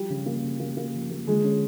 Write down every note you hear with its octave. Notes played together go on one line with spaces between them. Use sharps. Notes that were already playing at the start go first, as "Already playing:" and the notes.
Already playing: F3 G3 G4
C#3
A#3
C#3
A#3
A#3
F3
A#3
D3 G#3 G#4
C#4